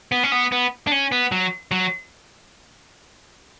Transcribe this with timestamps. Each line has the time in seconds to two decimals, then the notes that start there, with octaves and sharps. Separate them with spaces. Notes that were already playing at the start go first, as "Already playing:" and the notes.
0.12 B3
0.23 C#4
0.32 B3
0.52 B3
0.87 D4
0.92 C#4
1.12 B3
1.32 F#3
1.71 F#3